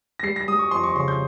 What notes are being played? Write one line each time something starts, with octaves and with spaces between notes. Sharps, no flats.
A#6
G3 C7
A#6
G3 D#6
C#6
F2 C6
C#6
C#3 C6
G6